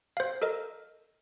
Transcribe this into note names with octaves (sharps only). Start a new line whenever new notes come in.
C5 F5
A4 A#4 D#5